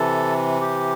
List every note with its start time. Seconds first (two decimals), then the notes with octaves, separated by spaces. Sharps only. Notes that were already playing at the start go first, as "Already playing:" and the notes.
Already playing: C3 E3 A4
0.61 G4